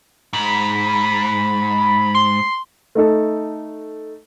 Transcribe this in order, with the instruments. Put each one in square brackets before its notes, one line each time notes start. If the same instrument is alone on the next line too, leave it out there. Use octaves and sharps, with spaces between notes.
[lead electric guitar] G#2 [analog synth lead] B5
[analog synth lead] C6
[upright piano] A3 D#4 A4